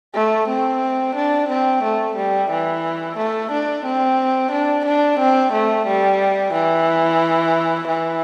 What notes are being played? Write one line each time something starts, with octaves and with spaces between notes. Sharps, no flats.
A3
C4
D4
C4
A3
G3
E3
A3
D4
C4
D4
D4
C4
A3
G3
E3
E3